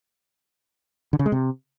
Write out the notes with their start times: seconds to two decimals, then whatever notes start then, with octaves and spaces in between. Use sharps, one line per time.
1.13 D3
1.19 C#3
1.26 G#3
1.32 C3